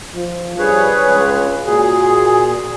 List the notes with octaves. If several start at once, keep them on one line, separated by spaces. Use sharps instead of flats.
F3
G2 G#4 B4 C#5
C#2
A#2 F#4 G#4